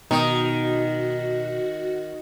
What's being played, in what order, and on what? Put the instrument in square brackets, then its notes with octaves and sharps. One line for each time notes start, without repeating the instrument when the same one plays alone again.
[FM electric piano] B2 [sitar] D#3 [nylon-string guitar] D#4 [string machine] F#4